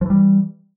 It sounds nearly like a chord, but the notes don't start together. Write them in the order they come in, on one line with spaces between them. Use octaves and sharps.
F3 E3 G3